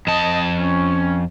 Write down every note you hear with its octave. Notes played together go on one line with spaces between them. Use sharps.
F2 D#5 A5
C#4